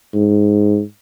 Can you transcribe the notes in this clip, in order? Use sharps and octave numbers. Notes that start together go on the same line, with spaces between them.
G#2